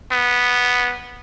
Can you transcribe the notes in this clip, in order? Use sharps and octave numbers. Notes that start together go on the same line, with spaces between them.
B3